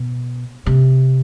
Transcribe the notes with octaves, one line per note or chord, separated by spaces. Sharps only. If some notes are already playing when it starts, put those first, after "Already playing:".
Already playing: B2
C3